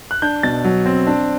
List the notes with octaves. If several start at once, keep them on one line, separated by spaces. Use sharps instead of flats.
F#6
D4 G6
B2 A6
F#3
C4
D4